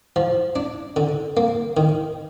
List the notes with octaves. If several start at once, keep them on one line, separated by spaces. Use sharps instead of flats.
F3
D4
D3
A#3
D#3